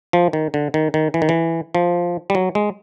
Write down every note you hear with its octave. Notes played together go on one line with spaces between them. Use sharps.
F3
D#3
D3
D#3
D#3
E3
D#3
E3
F3
G3
F#3
G#3